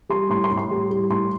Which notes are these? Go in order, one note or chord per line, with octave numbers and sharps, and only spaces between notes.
G3 C6
A2 C6
C6
A2
C6
G3
G3
A2 C6